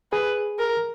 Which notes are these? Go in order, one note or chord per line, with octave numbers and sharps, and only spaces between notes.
G#4 B4
A#4